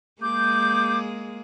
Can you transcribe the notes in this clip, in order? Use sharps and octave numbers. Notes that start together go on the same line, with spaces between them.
G#3 A#3 G#4 D6 G6